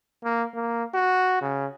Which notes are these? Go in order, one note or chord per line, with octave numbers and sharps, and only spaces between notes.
A#3
A#3
F#4
C#3